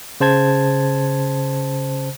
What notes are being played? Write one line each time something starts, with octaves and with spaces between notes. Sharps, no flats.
C#3 C5 A5 G#6